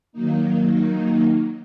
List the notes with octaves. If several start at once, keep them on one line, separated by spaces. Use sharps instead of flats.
D#3 F#3 A#3 D#4